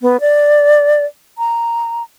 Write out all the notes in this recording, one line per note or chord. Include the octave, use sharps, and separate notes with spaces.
B3
D5
A#5